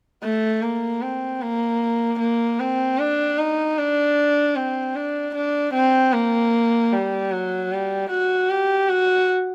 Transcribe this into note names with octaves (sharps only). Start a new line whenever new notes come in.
A3
A#3
C4
A#3
A#3
C4
D4
D#4
D4
C4
D4
D4
C4
A#3
G3
F#3
G3
F#4
G4
F#4